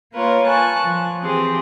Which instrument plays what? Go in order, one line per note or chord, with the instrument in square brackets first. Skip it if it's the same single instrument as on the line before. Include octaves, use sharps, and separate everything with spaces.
[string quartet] A#3 F4 A#4 B4 C#5
G#5 A5 C#6 F#6
F3
E3 C4 G4 G#4